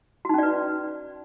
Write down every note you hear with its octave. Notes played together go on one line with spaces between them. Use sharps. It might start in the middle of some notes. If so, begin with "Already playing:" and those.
C#4 D#4 F#4 B4 D5